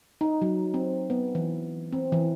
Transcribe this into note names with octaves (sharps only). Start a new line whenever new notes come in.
D#4
F#3
C4
B3
E3
C4
E3